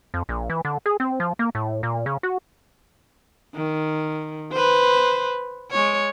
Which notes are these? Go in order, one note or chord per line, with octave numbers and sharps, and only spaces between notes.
F2
A#1
E3
D3
G#4
C4
F3
A#3
A2
A#2
C#3
F#4
D#3
B4 C5
G#3 C#5